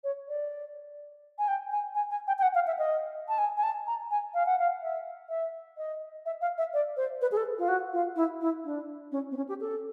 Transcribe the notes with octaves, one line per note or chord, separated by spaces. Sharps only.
C#5
D5
G#5
G5
G#5
G#5
G#5
G5
G5
F#5
F5
E5
D#5
A5
G#5
G#5
A5
A#5
G#5
F5
F#5
F5
E5
E5
D#5
E5
F5
E5
D5
C5
B4
G#4
A4
F4
F#4
F4
E4
E4
D4
C#4
C4
C#4
G4
A4